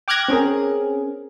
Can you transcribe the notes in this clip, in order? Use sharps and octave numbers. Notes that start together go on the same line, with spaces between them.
G5 D6 F6 F#6 G#6 A#6
C4 C#4 G#4 A#4